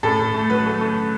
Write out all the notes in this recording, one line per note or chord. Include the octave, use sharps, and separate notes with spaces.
A2 A4
A2
A3
F#3 B4
A3
A3